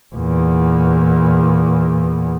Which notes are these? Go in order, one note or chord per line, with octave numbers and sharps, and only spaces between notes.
E2 A#2